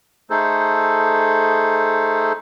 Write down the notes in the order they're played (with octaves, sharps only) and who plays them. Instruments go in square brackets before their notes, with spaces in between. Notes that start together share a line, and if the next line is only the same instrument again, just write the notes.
[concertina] A3 D#4 G#4 A4 C5